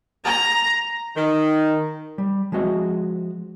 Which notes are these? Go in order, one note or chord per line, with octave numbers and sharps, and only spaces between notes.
A#5
D#3
G3
F3 G#3 C4 F#4 D#5 E5